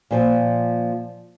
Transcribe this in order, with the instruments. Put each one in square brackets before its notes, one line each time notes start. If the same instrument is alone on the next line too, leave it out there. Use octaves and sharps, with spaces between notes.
[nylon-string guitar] A#2 F3